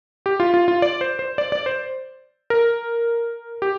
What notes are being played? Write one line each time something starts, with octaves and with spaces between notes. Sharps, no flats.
G4
F4
F4
F4
D5
C5
C5
D5
D5
C5
A#4
G4